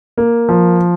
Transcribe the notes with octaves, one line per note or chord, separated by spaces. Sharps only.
A#3
F3